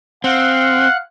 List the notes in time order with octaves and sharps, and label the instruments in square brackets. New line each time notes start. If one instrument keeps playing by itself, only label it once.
[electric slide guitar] C4 [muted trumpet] F5 [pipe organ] F#5 F#6